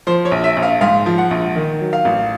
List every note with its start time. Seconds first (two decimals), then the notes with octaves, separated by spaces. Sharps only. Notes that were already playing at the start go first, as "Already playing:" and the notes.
0.07 F3 C5
0.25 C#5
0.31 A#1
0.44 E5
0.57 A#1
0.63 F5
0.81 G#2 F5
1.06 F3
1.18 F#5
1.31 A#1
1.55 D#3
1.81 F#3
1.93 F5
2.05 A1